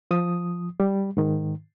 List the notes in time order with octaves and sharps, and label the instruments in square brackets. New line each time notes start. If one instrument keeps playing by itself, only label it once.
[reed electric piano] F3 D#6
G3
G#2 D#3